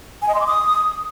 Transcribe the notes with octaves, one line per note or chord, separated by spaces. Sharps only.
G#5
D#5
C6
D6
D#6